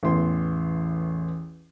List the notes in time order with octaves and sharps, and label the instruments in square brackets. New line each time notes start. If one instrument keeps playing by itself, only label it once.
[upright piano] A1 E2 C6